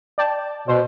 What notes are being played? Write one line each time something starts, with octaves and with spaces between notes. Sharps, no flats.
D5 G5 A5
B2 C5